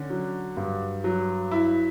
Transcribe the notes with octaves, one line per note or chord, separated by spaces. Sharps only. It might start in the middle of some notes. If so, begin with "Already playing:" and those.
Already playing: D3 C#4
F#3
G2
F#3
E4